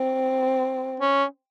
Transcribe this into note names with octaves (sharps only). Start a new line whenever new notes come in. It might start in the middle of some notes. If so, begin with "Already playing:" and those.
Already playing: C4
C#4